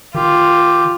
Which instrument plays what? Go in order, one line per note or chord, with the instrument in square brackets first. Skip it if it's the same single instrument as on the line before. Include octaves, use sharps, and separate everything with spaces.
[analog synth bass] D#3 [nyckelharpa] F4 [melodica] G4